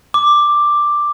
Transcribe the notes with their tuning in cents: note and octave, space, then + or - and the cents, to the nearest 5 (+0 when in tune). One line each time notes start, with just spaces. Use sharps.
D6 +5